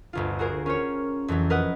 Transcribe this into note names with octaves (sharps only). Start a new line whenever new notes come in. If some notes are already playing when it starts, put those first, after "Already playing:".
G1 D2 F4
F#4 G#4 A#4 C5
C#4 F4 C5 C#5
F2 E3 F#3
A#4 B4 D#5 F#5